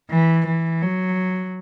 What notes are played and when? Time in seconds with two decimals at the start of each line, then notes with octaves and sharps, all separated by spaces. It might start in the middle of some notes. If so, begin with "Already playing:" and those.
0.10 E3
0.47 E3
0.82 F#3